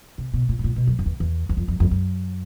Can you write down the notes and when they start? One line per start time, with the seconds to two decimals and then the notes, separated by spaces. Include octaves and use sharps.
0.18 C3
0.34 B2
0.49 A#2
0.59 A2
0.64 A#2
0.76 B2
0.87 F#2
0.99 F2
1.06 E2
1.20 E2
1.49 E2
1.57 F2
1.68 F2
1.80 F2
1.91 F#2